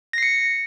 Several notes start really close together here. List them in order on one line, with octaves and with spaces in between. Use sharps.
A#6 C7 C#7